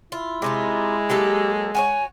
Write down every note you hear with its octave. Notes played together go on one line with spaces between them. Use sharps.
E4 F4
C3 G#3 D#4 F4
F#3 A#3 G4 A4
F#4 A#4 C#5 G#5